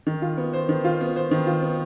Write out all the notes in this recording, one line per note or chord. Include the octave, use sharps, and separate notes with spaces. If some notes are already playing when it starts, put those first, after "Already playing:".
D#3
F4
B3
C5
D#3
F4
B3
C5
D#3
F4
B3